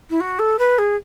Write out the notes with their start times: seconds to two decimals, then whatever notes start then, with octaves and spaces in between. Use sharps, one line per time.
0.10 E4
0.20 F#4
0.39 A4
0.59 B4
0.78 G#4